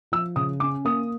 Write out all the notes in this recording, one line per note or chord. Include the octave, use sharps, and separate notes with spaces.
F3 E6
C#3 D#6
C#4 D6
A#3 D#6